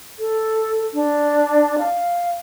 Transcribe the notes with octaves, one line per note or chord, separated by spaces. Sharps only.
A4
D4
F5